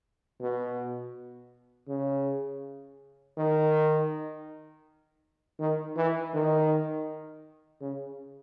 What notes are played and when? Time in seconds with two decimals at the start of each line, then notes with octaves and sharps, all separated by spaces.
0.40 B2
1.88 C#3
3.37 D#3
5.59 D#3
5.96 E3
6.34 D#3
7.81 C#3